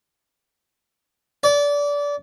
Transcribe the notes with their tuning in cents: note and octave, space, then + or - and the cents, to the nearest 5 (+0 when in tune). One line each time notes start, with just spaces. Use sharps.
D5 -25